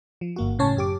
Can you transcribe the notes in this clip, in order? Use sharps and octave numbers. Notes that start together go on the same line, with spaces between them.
F3
G1 A#3 F#4
A2 C#3 C#4 C#5 A5
F#2 G4 D6